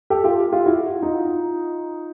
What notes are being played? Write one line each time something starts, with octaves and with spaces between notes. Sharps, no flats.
G4 A4
F4 G4
F4 G4
E4 F#4
D#4 F4